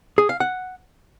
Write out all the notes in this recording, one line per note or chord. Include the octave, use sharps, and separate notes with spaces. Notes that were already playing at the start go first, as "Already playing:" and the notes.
G#4
F5
F#5